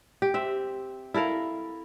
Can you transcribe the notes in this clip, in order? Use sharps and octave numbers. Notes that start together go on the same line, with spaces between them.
G4
C4 E5
E4 A4 A#4 F5